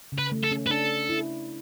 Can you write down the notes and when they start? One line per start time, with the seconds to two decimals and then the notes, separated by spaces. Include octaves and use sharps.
0.12 C#3
0.18 B4
0.32 A3
0.44 A4
0.51 C#4
0.67 B4
0.70 D4 A4
1.09 E4